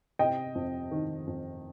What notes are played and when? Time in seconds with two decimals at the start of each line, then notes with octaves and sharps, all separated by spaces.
0.19 C3 D#5 G5
0.55 F2
0.91 D#3
1.27 F2